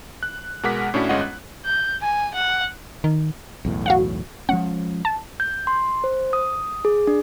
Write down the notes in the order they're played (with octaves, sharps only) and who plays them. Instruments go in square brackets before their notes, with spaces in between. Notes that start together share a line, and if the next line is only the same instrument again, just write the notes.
[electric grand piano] F#6
B2 G#3 A#4 F#5 D6 B6
A2 C#4 D4 E4 F#4
G1 G#3 C#4 F4 D#5 F#5
F#6
[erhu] G6
G#5
F#5
[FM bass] D#3
[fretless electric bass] B1 E2 A2
[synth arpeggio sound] F#4 F5 F#5
[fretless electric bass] F3 G#3 C#4 [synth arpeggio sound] F#5
[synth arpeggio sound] A5
[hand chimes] G6
C6
C5
D#6
G#4
D4